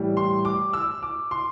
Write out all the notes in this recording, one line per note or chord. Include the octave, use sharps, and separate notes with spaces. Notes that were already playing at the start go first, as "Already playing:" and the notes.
Already playing: A2 E3 G3
C6
D6
E6
D6
C6